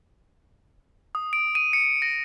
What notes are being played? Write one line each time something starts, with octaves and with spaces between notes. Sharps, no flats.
D#6
D7
D#7
C#7
A#6